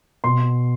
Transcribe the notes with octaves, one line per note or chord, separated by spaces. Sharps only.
B2 C6